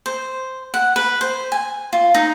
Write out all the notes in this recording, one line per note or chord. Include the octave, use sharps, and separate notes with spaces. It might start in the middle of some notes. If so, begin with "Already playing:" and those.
C5
F#5
B4
C5
G#5
F4
D#4